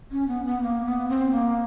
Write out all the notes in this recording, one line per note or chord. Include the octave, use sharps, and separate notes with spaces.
C#4
B3
B3
A#3
B3
C4
A#3